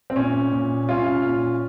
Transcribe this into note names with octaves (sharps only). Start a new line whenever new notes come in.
C4
A#2 C#4
A#2
C2 C#4 F4
A#2